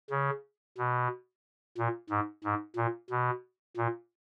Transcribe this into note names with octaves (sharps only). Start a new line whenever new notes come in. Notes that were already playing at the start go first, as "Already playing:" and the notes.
C#3
B2
A#2
G#2
G#2
A#2
B2
A#2